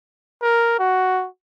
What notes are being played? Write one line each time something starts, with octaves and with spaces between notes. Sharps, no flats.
A#4
F#4